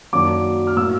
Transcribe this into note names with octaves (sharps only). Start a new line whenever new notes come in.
F#2 D#3 F#3 A#3 D4 D6
F6
A2 F#3 A#3 E6